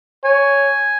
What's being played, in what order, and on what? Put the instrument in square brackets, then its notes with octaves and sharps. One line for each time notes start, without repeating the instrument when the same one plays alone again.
[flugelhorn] C#5 [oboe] G#5